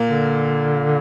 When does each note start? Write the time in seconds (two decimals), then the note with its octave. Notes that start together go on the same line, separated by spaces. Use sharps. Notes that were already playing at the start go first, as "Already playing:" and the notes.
Already playing: A#2 A#3
0.09 D3